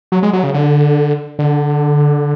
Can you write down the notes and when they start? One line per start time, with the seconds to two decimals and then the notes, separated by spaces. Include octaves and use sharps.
0.12 F#3
0.23 G#3
0.33 F#3
0.43 C#3
0.54 D3
1.39 D3